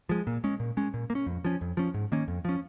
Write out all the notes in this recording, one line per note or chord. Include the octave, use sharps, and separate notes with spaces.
F3 G#3
A#2
G#3 C#4
A#2
G#3 C#4
A#2
A#3
C#4
F2
F3 C#4
F2
F3 C#4
G#2
D#3 A#3 C#4
F2
F3 C#4